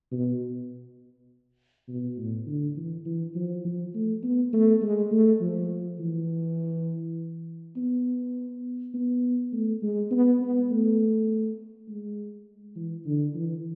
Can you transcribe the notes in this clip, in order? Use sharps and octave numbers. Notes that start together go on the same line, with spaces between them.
B2
B2
A2
D3
E3
E3
F3
F3
A3
B3
A3
G#3
A3
F3
E3
B3
B3
A3
G#3
B3
B3
A3
G#3
E3
D3
E3